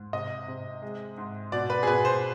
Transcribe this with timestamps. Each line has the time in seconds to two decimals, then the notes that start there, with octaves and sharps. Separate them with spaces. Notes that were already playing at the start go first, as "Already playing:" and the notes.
Already playing: G#2
0.13 C3 D#5
0.48 C3
0.82 G#3
1.18 G#2
1.52 B2 D5
1.70 B4
1.83 G#4
1.87 B2 B4
2.05 C5